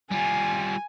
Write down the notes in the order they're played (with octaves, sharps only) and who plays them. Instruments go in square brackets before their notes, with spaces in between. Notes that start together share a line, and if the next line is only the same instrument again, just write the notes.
[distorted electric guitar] G3 F4 [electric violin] G#5